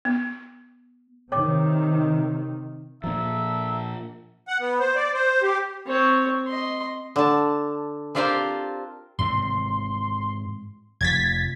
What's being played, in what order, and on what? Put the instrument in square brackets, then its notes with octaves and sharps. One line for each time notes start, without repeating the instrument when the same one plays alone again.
[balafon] B3
[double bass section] C3 D#3 [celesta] C#5 G5 D6
[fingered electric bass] A#2 F3 [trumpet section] A4 E5 A#5
[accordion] F#5
B3
C5
D5
C5
G4
[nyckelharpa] C4 C#5
D#5 C6
[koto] D3 A5
C4 D4 F4 G4 A#4 C5
[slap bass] G#2 C3 E3 [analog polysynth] C6
[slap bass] F1 F3 [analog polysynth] G#6 A6 B6